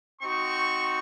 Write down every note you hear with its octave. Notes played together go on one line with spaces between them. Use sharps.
C4 D#4 F#4 C#6